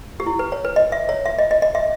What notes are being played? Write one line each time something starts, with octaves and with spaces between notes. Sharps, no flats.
G4
E4
B4
C#5
B4
D#5
E5
C#5
E5
D#5
D#5
D#5
E5